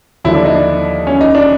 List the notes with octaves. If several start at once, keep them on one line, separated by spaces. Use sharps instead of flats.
D#2 D3 F3 E4
D4
D#4
D4
C#4
D#4
D4